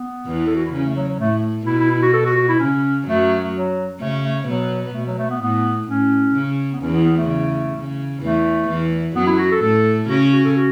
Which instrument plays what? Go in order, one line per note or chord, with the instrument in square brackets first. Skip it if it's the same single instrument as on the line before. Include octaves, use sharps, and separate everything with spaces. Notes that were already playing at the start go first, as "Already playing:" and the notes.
Already playing: [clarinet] B3
[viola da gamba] E2 E3
[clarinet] A4
F#4
E4
[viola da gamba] C#3 [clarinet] C#4
[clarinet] A3
F#3
F#3
[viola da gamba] A2 [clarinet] A3
[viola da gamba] B2 [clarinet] E4
[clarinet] E4
E4
F#4
A4
F#4
F#4
E4
[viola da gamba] C#3 [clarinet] C#4
[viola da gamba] F#2 F#3 [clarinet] A3
[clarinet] F#3
[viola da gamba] C#3 C#4 [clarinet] A3
[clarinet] A3
[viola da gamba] B2 B3 [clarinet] F#3
[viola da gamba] B2 [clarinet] A3
[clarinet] F#3
A3
B3
[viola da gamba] A2 [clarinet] B3
[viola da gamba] A2 [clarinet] C#4
[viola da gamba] C#3
[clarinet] B3
[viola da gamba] E2 E3 [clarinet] C#4
[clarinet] B3
B3
A3
[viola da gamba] C#3
C#3
[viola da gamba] E2 E3 [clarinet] A3
[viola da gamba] E2 E3
[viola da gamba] F#2 F#3 [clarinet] B3
[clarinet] E4
F#4
A4
[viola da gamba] A2 A3 [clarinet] A4
[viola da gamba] C#3 C#4 [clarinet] F#4
[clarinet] F#4
A4
F#4